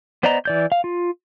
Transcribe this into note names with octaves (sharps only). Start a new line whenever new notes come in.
B3 C5 D5 D#5 A#5
E3 D5 G6
F5
F4